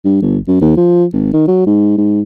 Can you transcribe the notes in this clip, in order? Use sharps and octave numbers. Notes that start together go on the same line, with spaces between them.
G2
G1
F#2
D#2
F3
G#1
D#3
F#3
G#2
G#2